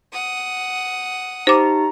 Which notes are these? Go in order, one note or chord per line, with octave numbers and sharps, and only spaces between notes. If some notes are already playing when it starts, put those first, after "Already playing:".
F#5 D#6
D#4 G4 C5 A#5 D6